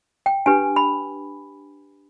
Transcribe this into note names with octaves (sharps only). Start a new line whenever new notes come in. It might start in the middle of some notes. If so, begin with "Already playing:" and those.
G5
D4 G4 B4 G#5
B5